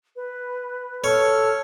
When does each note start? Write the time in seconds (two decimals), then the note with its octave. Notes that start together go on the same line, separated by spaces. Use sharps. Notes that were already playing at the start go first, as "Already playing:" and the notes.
0.16 B4
1.04 A4 C#5 F6